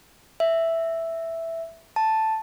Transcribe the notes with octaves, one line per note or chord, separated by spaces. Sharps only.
E5
A5